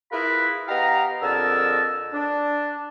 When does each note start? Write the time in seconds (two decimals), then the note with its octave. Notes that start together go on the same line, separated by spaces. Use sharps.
0.11 E4 F4 G#4 A#4 B4 B5
0.68 B3 G4 D#5 F5 A#5
1.22 F2 D3 G#4 A#4 A5 E6
2.13 D4